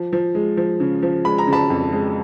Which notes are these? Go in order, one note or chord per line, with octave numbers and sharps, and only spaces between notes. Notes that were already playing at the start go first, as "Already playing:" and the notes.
Already playing: F3
F3
G#3
F3
C#3
F3
G#3 B5
A#5
C#3
A5 B5
F2
G#3